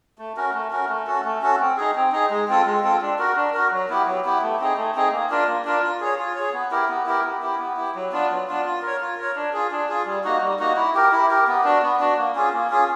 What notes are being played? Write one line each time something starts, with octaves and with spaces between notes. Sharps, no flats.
A3
C#4 F#4 A#4
A3
C#4 F#4 A#4
A3
C#4 F#4 A4
A3
C#4 F#4 A4
C4
D#4 G#4
C4
D#4 G#4
G#3
C4 F4 A4
G#3
C4 F4 A4
D4
F#4 A#4
D4
F#4 A#4
F#3
B3 E4 G4
F#3
B3 E4 G4
A3
C4 D#4 G#4
A3
C4 D#4 G#4
A#3
D4 F4 A#4
A#3
D4 F4 A#4
F4
G#4 C#5
F4
G#4 C#5
B3
E4 G4 A#4
B3
E4 G4 A#4
B3
E4 G4
B3
E4 G4
F#3
B3 D4 F4
F#3
B3 D4 F4
F4
A#4 C#5
F4
A#4 C#5
D4
F4 G#4
D4
F4 G#4
G3
A#3 D#4 F#4
G3
A#3 D#4 F#4
E4
G4 A#4
E4
G4 A#4
B3
D4 F#4
B3
D4 F#4
A#3
C#4 F4 G#4
A#3
C#4 F4 G#4